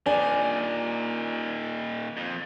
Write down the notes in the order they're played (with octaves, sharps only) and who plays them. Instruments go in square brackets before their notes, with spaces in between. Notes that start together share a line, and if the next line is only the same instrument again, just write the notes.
[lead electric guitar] A#2 D#3 [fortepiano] D4 G#5
[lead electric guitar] F2